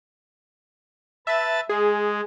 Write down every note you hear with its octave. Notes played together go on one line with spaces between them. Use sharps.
B4 E5 A5 A6
G#3 G#4